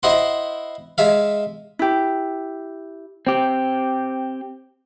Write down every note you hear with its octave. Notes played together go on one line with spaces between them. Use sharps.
E4 C5 D#5 F#5 C6
G#3 E5 F5
E4 G4
C4 G4